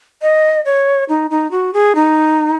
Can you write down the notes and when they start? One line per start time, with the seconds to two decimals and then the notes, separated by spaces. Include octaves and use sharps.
0.22 D#5
0.65 C#5
1.09 D#4
1.31 D#4
1.51 F#4
1.74 G#4
1.95 D#4